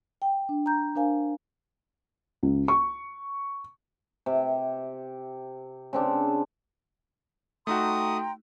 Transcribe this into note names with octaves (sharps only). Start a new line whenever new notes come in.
G5
D4
A#5 G6
D4 A#4 C5 F5 G#5
C#2
C#6
C3
C#3 C4 D4
A3 D#4 F#4 G5 A#5 C6 D#6